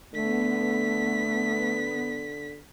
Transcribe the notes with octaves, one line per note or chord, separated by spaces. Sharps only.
D3 A3 B3 B6